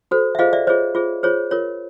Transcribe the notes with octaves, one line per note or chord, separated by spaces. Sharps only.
F#4 A4 C5
E5
F4 G#4 C5 D#5 F5
D5 E5
F4 G#4 C5 C#5 D#5
F4 G#4 C5
F4 G#4 C5 C#5
F4 A#4 C#5